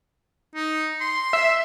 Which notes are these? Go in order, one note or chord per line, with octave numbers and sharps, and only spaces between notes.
D#4
C6
E5